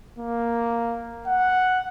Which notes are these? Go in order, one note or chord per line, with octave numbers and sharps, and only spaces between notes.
A#3
F#5